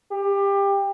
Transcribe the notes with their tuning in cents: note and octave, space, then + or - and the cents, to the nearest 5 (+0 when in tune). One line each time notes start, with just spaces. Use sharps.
G4 +20